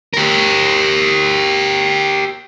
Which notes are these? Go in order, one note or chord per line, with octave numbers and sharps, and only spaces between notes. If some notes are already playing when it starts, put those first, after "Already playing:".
G4 A#4